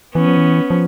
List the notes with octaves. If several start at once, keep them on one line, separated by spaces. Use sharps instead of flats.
E3 B3 C#4
F3
E3
F3